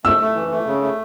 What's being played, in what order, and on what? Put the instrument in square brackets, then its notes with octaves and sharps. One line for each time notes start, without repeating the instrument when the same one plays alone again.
[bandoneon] A3 [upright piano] E6
[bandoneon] A3
E3
A3
C#3
A3